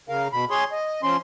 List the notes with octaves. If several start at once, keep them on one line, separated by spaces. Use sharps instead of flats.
C#3 A#4 F5
B2 B5
G#4 C#5 C6
D#5
F3 C#4 C6